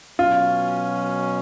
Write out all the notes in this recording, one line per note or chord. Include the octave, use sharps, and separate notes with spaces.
B2 F#3 C#4 F4